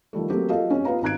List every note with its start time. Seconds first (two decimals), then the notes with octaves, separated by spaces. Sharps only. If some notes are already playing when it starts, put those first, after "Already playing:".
0.13 D#3 F3 G3 A3
0.30 F#3 A3 A#3 C4 F#4 G4
0.49 F4 A4 D#5 F5
0.71 F2 C#4
0.85 B3 F4 B4 F5 A#5
1.02 G#1 D#4 A#5 F#6 G#6 D7